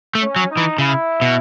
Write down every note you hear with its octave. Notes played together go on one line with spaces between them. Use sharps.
A3
C#4
F#3
D#4
E3
C#3 E4
B2